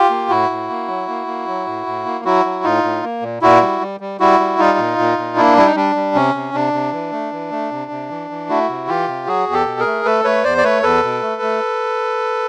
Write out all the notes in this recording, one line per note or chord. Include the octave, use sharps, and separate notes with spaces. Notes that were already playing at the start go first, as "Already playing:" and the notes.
Already playing: F4 G4
A#3
A2 E4 F#4
A2
A#3
F#3
A#3
A#3
F#3
A2
A2
A#3
F#3 E4 F#4
F#3
A2 D#4 F4
A2
A#3
A#2
A#2 E4 F#4
G3
G3
G3
G3 E4 F#4
G3
G3 D#4 F4
A#2
A#2
A#2
A#3 D4 E4
G3 E4
D#4
G3 D4
G3
C3 C#4
C3
C3 D4
C3
E3
A3
E3
A3
C3
C3
E3
E3
A3 E4 F#4
C3
E3 F4 G4
C3
F#3 F#4 G#4
E2
G4 A4
B2
G#4 A#4
A3
A3 A4 B4
A3 B4 C#5
E2 C5 D5
D5
A3 B4 C#5
E2 A4 B4
B2
A3
A3